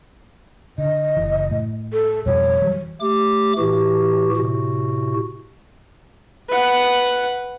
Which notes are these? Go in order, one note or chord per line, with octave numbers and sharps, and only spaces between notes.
D3 D#5
F#1 E3
A2
A4
F2 B2 G3 C#5
E3 F#3 G3
A3 G4 D6
A2 E3 F#4 G4
A2 C3 F#4
B4 F#5